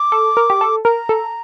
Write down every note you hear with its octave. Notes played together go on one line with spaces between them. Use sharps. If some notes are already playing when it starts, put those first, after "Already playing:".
Already playing: D6
A4
A#4
G4
A4
A#4 A#5
A4